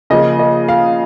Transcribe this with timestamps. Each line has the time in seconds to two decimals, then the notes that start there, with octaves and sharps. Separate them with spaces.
0.10 C#3 F3 A#3 D#5
0.39 D#5
0.68 F5